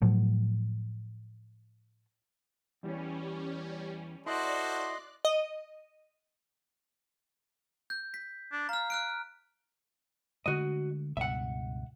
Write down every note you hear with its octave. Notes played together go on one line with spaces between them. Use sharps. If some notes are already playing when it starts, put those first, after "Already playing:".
A2 F3 F#3 A3
E2 E3 G3 C#4
E4 F#4 A4 C5 D5 D#5 C6 F#6
D#5
G6
B6
D4
F5 A#5 F6
F6 F#6 D7
D3 G#3 A3 F#4 D#5
C#2 G2 B2 E5 F#5